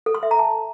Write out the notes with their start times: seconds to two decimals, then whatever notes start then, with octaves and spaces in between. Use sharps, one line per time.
0.06 A4
0.15 C6
0.23 E5
0.31 A#5
0.39 A5